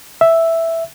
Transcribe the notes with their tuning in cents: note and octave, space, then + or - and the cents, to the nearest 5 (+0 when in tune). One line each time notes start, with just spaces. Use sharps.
E5 +0